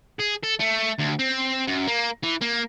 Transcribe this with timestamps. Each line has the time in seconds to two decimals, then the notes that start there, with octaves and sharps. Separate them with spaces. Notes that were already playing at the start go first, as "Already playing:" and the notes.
0.19 G#4
0.43 A4
0.59 A3
0.98 D2
1.19 C4
1.68 F#2
1.87 A#3
2.23 E3
2.42 A#3